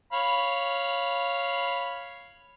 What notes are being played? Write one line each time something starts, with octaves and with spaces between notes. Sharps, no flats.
C#5 F5 B5